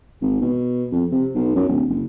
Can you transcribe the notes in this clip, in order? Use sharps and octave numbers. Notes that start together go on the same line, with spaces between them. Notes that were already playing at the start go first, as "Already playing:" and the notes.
G#1
B2
F2
C3
B1
F#2
D1
F#1